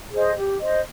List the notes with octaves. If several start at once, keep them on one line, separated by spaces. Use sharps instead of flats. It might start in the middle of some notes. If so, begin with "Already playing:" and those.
G#4 C5 D#5
G4
C5 D#5